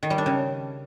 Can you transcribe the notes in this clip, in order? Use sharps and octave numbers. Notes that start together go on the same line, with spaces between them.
D#3
G3
D4
C#3